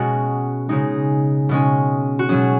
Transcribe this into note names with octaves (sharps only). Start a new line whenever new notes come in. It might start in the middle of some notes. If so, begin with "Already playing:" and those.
Already playing: B2 G#3 B3 C#4 F#4 G#4
C#3 G#3 D#4 G#4
B2 G#3 C#4
F#4
B2 F#3 C#4 G#4